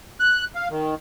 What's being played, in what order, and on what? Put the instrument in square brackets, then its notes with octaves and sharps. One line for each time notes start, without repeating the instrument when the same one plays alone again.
[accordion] F#6
F5
D#3